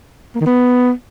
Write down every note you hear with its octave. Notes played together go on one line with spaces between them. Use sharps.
A#3
D#3
B3